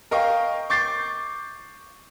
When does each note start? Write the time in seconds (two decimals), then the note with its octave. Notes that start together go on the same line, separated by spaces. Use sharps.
0.11 A#4 D#5 F5 G5 C#6
0.70 C#6 D6 G6 A6 C7